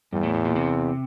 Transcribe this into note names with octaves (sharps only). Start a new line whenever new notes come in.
E2 G2
A2
A2
A#2
C3